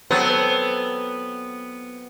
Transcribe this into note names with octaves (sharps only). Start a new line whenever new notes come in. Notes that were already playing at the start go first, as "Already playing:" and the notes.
F#3 B3 C4 A4